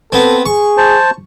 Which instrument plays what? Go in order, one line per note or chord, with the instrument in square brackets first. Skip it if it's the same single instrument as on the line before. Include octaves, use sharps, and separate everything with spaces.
[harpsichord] B3 C4 [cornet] A4
[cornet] G#4 [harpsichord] C#6
[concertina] C5 A5